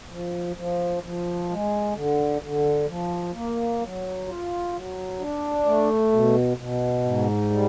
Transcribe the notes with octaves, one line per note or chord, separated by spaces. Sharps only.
F3
F3
F3
G#3
D3
D3
F3
A#3
F#3
F4
F#3
D4
A3
B2
B2
G#2
G3